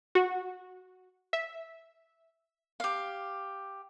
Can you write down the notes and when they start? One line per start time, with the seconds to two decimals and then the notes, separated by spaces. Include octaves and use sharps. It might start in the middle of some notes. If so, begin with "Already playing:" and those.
0.15 F#4
1.33 E5
2.80 G4 F5